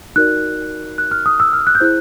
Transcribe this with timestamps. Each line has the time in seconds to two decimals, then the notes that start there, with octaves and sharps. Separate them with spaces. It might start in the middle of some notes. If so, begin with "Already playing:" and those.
0.16 D#4 F#4 A#4 D5 F#6
0.98 F#6
1.11 F6
1.26 D#6
1.40 E6
1.53 F6
1.67 F#6
1.75 G6
1.80 E4 G#4 C5 F#6